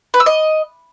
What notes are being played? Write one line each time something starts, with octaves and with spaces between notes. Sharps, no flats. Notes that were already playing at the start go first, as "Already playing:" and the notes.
B4
E6
D#5